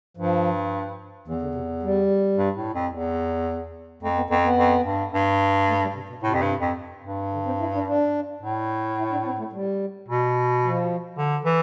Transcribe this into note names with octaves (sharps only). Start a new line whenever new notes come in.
G2 F3
E2 E3
D3
C3
G3
G2
A2
F2
E2
F2 A3
B3
F2 B3
B3
F2
G2
G2
A3
G3
C3
B2
A2 C3
F2
G2
F2
G2
D3
C4
E4
D4
D4
A2
E4
D4
C4
A3
G3
B2
F3
D3
E3